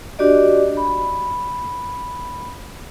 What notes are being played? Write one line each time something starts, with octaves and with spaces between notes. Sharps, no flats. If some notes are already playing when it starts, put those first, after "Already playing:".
D4 F#4 G4 D5 D#5
B5